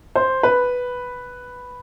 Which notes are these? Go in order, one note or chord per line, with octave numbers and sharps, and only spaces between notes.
C5
B4